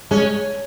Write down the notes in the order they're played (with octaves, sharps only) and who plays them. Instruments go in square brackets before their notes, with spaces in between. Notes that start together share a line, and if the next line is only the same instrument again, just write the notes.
[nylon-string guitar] G#3 [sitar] C#4